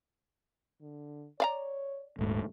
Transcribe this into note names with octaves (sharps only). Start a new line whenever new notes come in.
D3
C#5 D5 F5 A#5
D#1 G#2 A3